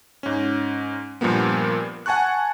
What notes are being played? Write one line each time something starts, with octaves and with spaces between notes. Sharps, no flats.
G#2 C#4
G2 A#2 F3 G3 A#3 B3
F#5 G#5 A5 C#6 F#6